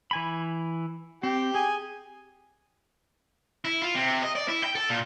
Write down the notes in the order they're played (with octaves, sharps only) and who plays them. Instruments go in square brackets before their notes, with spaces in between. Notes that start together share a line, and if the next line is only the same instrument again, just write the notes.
[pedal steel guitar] E3 G#5 B5
[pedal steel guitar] C4 [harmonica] G4 G5
[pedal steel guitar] G#4 [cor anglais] G#5
[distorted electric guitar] E4
F4
C3
D#5
D5
E4
G5
A4
A#2